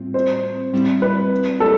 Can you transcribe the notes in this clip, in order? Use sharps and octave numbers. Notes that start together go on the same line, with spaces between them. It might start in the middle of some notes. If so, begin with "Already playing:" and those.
Already playing: A2 G3 C4 F4
C5
A2 G3 C4 E4
B4
A4